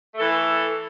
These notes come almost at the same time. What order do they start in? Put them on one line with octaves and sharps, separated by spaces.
A3 A4 E3